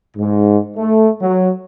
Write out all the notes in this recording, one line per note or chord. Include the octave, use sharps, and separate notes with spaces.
G#2
A3
F#3